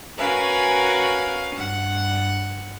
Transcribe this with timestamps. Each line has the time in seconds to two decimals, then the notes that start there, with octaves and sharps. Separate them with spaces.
0.18 C#4 F#4 A#4 B4 F5 G#5
1.55 G2 F#5